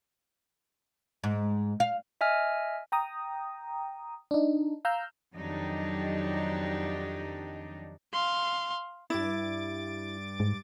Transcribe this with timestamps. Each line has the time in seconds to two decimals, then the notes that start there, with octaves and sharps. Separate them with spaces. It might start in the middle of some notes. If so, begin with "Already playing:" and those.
1.24 G#2
1.80 F5
2.21 D#5 E5 G#5 F6
2.92 G5 A#5 D#6
4.31 D4 D#4
4.85 F5 A#5 E6 F6 G6
5.34 F2 D#3 F#3 D4 D#4 G4
8.13 F5 C6
9.10 G2 E4 D6 A6
10.40 G#2